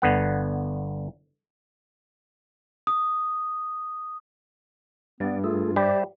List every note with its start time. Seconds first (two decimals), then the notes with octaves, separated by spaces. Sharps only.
0.02 G1 D3 B3 F#5
2.87 D#6
5.20 G2 B3 D5
5.44 A3 F4 G#4 A4
5.76 G3 G4 C5 D5 E5